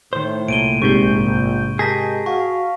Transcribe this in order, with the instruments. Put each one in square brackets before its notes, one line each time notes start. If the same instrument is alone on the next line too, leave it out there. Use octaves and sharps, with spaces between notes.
[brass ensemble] A2 [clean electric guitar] D#3 C5
[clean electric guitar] C2 A#2 [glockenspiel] D7 D#7 G7
[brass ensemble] A#1 [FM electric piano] G#2 C3 G6 [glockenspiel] C#6
[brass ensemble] G4 A#4 D#5 [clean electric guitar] G#4 [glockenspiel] A5 A#6 B6
[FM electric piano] F#4 [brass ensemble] F5 [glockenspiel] C#6